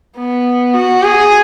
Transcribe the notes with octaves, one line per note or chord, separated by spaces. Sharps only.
B3
F#4
G#4